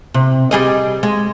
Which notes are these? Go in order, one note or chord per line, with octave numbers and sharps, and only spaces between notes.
C3
G3 G#4 D#5
G#3